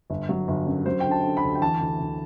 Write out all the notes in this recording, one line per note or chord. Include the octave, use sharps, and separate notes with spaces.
G1
F#3
G1
F#2
F#3 C5
D3 G5
A5
D3
B5
D2
G5
E3 A5
D2
D2